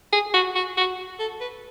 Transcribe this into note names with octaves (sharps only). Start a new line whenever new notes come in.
G#4
F#4
F#4
F#4
A4
B4